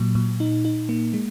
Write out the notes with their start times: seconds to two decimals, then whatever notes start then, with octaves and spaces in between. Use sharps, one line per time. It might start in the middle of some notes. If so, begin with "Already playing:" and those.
Already playing: A#2 F#3
0.15 A#2
0.40 D#4
0.65 D#4
0.89 A#3
1.14 G#3